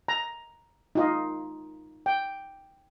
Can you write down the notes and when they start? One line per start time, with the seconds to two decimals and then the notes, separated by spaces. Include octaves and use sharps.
0.08 A#5
0.95 D#4 F4 D#5
2.06 G5